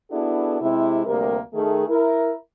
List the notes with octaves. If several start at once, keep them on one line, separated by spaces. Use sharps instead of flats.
B3 D4 E4 F#4 G#4 A4
C3 G#3 E4
D2 C3 G3 A#3 A#4
D#3 A3 G#4
E4 A#4